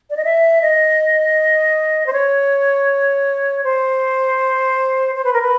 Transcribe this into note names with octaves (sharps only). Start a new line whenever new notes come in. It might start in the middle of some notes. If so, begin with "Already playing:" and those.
D5
D#5
E5
D#5
C5
C#5
C5
C5
B4
A#4
B4